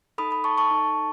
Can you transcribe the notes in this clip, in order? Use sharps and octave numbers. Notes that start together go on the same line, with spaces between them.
D#4 A4 B5 D#6
B5 D#6
A5 C#6
A5 C#6
D#4 A4